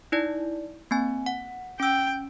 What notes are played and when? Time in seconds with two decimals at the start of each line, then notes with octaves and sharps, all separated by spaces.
0.12 D#4 E4 D5
0.91 A#3 C4 G#5
1.26 F#5
1.80 C#4 G5 E6